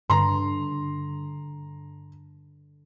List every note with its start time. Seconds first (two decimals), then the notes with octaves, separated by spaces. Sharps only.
0.10 G2 D3 A#5 C6